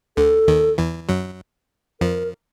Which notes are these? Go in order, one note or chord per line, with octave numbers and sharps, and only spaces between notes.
D2 D3 A4
D#2 D#3
E2 E3
F#2 F#3
F2 F3 A#4